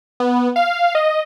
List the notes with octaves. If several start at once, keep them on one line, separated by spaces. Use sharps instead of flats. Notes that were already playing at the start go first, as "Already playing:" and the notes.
B3
F5
D#5